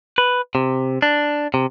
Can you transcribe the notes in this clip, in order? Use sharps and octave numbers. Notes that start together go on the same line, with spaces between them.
B4
C3
D4
C3